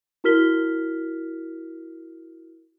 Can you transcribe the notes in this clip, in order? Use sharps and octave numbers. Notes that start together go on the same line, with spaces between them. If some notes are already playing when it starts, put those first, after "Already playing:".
E4 F#4 A#4 F6 B6 G7